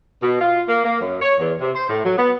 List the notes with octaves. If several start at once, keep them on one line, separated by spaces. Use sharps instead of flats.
B2
F4
A#3
A#3
F#2
C#5
E2
C3
C5
A2
F#3
B3